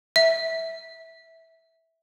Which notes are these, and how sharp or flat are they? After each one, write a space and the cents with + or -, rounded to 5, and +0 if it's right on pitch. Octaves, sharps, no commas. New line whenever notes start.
E5 -10